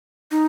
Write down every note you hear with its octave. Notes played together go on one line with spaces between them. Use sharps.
D#4